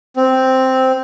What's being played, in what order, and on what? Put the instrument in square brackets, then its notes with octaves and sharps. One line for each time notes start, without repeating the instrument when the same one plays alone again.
[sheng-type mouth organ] C4